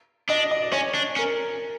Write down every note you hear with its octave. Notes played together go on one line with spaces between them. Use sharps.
D4 D#5
D#5
D5
C#4 C#5
D4
C#4 A#4